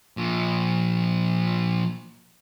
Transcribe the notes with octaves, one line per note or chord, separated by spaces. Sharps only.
A#2 F3